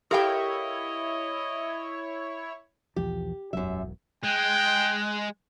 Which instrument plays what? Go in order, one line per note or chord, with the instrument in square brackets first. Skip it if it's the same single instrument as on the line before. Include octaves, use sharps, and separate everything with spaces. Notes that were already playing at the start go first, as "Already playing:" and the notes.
[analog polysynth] E4 C#5 [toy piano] G4 A4 [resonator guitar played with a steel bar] A#4 F5 G5 [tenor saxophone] D#5
[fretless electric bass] B1 E2 F3 [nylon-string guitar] G4
[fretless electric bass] E1 B1 F#3 [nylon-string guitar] F#2 E5
[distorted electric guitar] G#3 [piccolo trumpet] G5 [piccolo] F#6